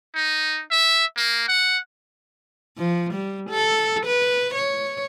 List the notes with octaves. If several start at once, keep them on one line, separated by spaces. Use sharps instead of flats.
D#4
E5
A#3
F#5
F3
G3
A4
B4
C#5